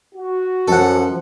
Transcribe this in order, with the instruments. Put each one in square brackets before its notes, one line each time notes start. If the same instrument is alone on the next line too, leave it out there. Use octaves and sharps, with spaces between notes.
[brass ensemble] F#4
[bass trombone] F#2 [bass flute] F3 [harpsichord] A4 F#5